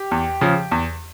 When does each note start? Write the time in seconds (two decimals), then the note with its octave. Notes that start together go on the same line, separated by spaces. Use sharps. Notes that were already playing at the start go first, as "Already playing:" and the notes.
Already playing: G4
0.11 E2
0.41 C#3 F3
0.71 E2